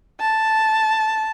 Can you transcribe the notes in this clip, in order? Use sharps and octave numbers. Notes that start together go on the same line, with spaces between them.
A5